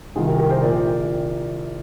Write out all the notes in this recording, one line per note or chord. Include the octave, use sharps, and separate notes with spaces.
C2 C3 D#3 F4 G#4
G4 A#4
G4 A#4
G#4 C5
A#1 A#2 A#4 D5